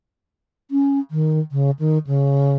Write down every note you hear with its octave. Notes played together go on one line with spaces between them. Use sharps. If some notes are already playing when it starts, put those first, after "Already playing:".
C#4
D#3
C#3
D#3
C#3